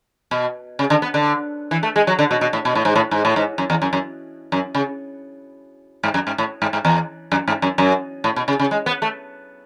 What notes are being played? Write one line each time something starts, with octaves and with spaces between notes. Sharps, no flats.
B2
C#3
D3
B3
D3
E3
A3
G#3
F#3
D3
B2
B2
A2
B2
A2
G#2
A2
G#2
A2
G#2
F#2
E2
F#2
F#2
F#2
C#3
G#2
F#2
G#2
A2
G#2
G#2
E2
F#2
G#2
F#2
F#2
A2
B2
C#3
C#3
G#3
B3
A3